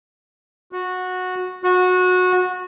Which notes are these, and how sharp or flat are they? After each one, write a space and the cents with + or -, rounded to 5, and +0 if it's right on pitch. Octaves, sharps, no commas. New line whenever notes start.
F#4 -15
F#4 -20